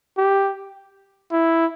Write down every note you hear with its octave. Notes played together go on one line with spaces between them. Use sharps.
G4
E4